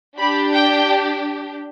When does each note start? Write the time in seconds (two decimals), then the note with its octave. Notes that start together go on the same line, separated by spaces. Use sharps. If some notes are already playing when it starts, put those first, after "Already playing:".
0.18 D4 G4 B5
0.53 G5